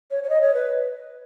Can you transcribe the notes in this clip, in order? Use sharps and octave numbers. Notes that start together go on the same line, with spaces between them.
C#5
C#5
D#5
C#5
B4